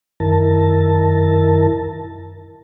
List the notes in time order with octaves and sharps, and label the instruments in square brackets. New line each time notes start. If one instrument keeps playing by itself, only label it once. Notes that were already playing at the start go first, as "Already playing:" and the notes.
[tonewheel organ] F#2 D#3 E4 A#4 A5